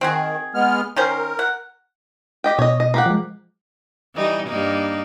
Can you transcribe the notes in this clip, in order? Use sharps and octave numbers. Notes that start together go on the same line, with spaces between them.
D#3 C4 F#4 G#4
G#3 B3 F6
D#3 C#4 A#4 C5
F#5
G4 D#5 G5
B2 C#5 D#5
D#5
A#3 G4 F#5
F3 G#3
E3 G3 D#4
G2 A#3 D#4